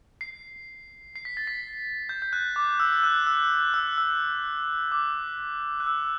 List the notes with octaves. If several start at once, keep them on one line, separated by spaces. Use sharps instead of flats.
C7
C7
B6
A6
B6
G6
G6
F#6
D6
E6
E6
F#6
E6
E6
E6
D6
F#6
E6